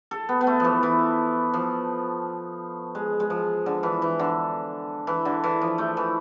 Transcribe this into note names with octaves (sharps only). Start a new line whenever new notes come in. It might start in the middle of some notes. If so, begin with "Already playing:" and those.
A4
B3
B3
A3
E3 F3
E3
F3
G#3
G#3
F3
D3
E3
E3
D3
E3
D3
E3
F3
A3
E3